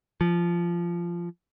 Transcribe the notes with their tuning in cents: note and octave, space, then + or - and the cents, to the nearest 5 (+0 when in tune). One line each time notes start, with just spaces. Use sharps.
F3 -15